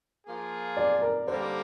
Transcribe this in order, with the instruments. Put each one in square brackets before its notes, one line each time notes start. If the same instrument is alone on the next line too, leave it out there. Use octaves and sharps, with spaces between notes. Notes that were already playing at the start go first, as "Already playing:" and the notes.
[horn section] F3 A#3 F4 G#4
[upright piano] D5
A#4
[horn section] D3 G3 A#3 [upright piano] C5